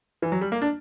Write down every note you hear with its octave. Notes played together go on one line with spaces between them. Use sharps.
E3
F#3
G3
A#3
D4